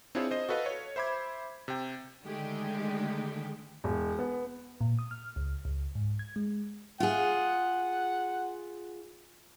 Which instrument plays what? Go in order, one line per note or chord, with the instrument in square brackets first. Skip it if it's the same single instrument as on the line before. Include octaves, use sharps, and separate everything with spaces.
[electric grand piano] C4 D4 E4 F4 G#4 C#5
C5 D#5 D#6
F#4 A4 B4 D#5 F5
C#5
C5 E5 B5 D6 G#6
C3 G5
[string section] D3 D#3 G#3 A3 G4
[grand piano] E1
B3
[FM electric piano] A#2
D#6
F6
C#2
C#2
G#2
G#6
G#3
[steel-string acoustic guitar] F4 G#4 [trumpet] F#5